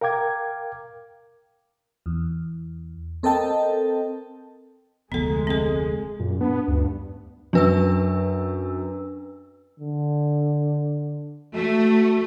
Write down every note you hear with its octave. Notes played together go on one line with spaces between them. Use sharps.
A#4 F5 G5 D6 G#6
E2
C4 A4 A#4 D#5 G5 A5
F1 D2 G#3 B3 G#4 A4
C4 A4
F#2 A#2
B3 D4
D2 G2
F#2 D4 B4 E6
D3
A3 F#4